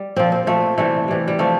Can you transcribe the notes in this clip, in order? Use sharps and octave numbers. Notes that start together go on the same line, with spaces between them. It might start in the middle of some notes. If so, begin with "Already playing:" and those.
Already playing: G3
A#2 F3 C4
C4
A#2 F3 A3
C3 E3 G3 A3
C3 E3 G3
G3
C3 F3 A3